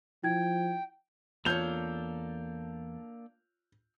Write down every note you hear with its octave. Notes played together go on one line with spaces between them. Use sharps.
F3 E4 G5 G#6
E2 A#3 D4 F4 A4 C#5 G6 F7